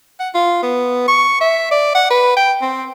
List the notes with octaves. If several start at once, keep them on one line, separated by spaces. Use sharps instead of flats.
F#5
F4
B3
C#6
E5
D5
F#5
B4
G5
C4